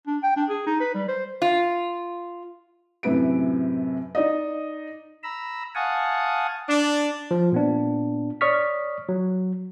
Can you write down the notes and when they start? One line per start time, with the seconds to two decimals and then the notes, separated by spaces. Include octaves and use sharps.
0.07 D4
0.23 G5
0.36 D4
0.49 G#4
0.66 D#4
0.80 B4
0.94 G3
1.08 C5
1.42 F4
3.03 F#2 A2 C3 B4 D7
4.15 D#4 D5 D#5
5.23 A#5 B5 E6
5.75 F5 F#5 G#5 A5 C#6 D#6
6.69 D4
7.31 F3
7.52 A#2 B3 D4
8.41 C#5 D5 C#6 D#6 F6 B6
9.09 F#3